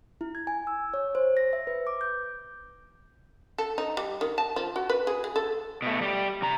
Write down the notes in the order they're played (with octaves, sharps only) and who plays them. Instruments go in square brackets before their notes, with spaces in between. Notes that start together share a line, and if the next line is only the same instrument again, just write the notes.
[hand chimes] E4
G#6
G#5
E6
C#5
C5
A#6
E5
B4
D6
G6
[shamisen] A4
D#4
G3
D#3
A5
F3
F#4
B4
G#4
G#4
A4
[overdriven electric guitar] B2 A3
G3 G4
C3 A#5